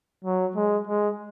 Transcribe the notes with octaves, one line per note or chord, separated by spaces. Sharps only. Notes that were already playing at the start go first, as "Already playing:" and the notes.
F#3
G#3
G#3